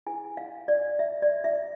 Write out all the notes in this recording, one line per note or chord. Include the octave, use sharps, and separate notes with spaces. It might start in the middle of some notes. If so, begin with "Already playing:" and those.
E4 G#4 B4 G#5
F5
D5
E5
D5
E5